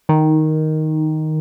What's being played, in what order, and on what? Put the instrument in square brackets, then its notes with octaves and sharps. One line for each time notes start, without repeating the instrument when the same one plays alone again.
[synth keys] D#3